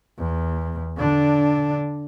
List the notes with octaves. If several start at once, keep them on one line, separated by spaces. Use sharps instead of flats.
E2
D3 D4